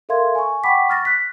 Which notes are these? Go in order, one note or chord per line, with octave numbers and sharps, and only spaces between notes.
A4 A#4 E5 F5 C6 G#6
G#5 C#6
F#5 G5 B5 C#6 D6 B6
C#6 F6 A6 A#6
F#6 B6